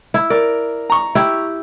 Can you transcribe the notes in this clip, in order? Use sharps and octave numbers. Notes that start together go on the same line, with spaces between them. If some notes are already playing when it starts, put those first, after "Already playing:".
E4
A#4 D5
A#5 C#6
E4 G4